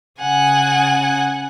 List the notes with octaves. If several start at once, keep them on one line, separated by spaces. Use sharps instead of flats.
C#3 F#5 G#5